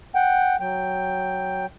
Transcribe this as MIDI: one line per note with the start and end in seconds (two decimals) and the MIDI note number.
0.15 0.56 78
0.15 0.56 79
0.60 1.66 54
0.60 1.66 79